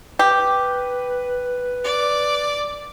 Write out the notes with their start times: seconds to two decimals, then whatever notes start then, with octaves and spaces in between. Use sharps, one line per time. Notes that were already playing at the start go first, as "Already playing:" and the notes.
0.19 G4 B4
1.84 D5